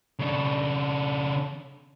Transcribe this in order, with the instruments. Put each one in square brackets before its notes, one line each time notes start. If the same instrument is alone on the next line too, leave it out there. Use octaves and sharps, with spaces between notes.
[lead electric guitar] C#3 D4